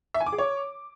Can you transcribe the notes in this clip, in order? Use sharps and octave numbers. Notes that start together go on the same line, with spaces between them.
E5
G#5
D6
G#4
C#5